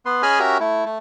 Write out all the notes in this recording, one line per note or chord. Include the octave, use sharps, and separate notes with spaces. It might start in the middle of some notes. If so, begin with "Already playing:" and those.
B3 B4 C6
C#4 G#4 D#5 G#5 B5 F6
C#4 F#4 G4 A#4 E5 A#5
A3 E4
A3